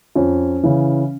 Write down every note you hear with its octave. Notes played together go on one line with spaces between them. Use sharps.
F2 C#4
C#3 E3